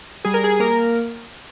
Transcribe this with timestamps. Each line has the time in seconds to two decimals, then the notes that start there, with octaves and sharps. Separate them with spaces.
0.25 G3 G#4
0.34 A#4
0.44 G#4
0.60 A#3 A#4